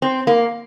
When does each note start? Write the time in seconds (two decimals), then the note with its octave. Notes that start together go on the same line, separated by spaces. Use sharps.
0.02 C4
0.27 A#3